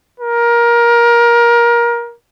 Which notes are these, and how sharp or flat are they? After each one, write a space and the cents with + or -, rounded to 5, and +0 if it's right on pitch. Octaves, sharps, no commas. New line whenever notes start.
A#4 +20